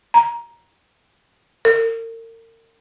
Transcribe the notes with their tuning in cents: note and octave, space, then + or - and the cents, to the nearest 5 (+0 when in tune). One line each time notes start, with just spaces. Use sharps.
A#5 +15
A#4 -40